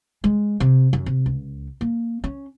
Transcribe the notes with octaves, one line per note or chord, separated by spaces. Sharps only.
G#3
C3
F#2
C3
C#2
A#3
C#4